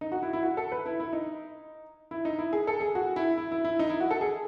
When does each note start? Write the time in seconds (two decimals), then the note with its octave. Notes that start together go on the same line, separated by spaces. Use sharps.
0.01 D#4
0.12 F#4
0.22 E4
0.33 E4
0.43 F#4
0.57 A4
0.72 B4
0.86 E4
1.00 E4
1.13 D#4
2.11 E4
2.25 D#4
2.39 E4
2.53 G#4
2.67 A4
2.81 G#4
2.95 F#4
3.16 E4
3.37 E4
3.52 E4
3.65 E4
3.79 D#4
3.89 E4
4.00 F#4
4.11 A4
4.21 G#4